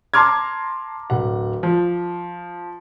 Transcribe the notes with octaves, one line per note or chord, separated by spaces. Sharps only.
A5 A#5 C6 D6 F6 G#6
D1 F#5
F3